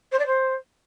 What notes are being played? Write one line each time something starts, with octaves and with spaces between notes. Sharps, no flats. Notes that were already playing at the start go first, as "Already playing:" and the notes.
C5
D5
C5